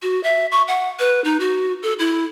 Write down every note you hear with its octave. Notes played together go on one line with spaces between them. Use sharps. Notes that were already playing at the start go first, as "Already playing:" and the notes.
F#4
E5
C#6
F#5
B4
D#4
F#4
A4
E4